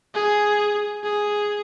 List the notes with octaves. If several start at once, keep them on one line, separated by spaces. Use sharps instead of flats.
G#4
G#4